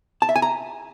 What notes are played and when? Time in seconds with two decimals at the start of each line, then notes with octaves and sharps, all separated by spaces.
0.22 A5
0.29 E5
0.36 G#5
0.42 A#5